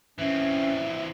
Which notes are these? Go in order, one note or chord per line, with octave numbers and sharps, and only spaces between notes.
E3 C4 C#4 E5